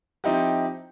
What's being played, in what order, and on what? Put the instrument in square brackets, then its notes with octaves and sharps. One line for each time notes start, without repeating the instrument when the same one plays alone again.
[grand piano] F3 C4 D#4 E4 G4